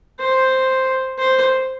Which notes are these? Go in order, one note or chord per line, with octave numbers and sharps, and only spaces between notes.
C5
C5